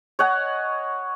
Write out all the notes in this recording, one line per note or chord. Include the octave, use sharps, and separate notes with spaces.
C#5 D#5 F#5 G#5